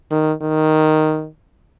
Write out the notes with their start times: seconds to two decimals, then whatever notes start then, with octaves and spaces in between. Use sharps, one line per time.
0.11 D#3
0.42 D#3